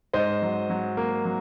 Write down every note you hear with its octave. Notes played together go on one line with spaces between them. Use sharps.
G#2 C5 D#5
F#3
F#3
A#3
F#3